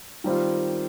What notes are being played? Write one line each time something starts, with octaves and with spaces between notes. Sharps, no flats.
D#3 G3 C4 F4